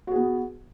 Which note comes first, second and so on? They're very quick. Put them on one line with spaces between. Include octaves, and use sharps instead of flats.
F#4 G#4 B3